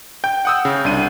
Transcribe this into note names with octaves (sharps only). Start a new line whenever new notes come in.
G5 G6
F#5 D#6 E6
C#3
C2 D4 D#7